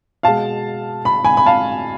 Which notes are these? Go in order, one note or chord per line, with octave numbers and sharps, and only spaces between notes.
B2 G#3 F5 A5
B5
G#5 B5
B5
F5 A5